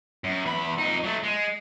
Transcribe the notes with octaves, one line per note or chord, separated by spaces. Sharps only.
F#2
E2 B5
F2 D#4
F#3 A3
G#3